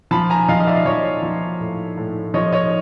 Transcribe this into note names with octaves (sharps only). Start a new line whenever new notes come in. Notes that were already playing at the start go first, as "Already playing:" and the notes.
F3 A5 B5
G#5 A#5
F3 D#5 F5
D#5
D5 E5
F3 C#5 D#5
F3
A2
A2
F3 C#5 D#5
C#5 D#5